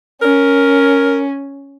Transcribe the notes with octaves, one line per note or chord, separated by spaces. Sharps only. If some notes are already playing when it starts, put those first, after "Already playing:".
C#4 A#4